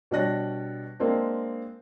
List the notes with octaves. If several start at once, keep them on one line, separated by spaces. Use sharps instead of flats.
B2 G3 D4 C#5 F#6 A#6
G#3 A#3 C4 D4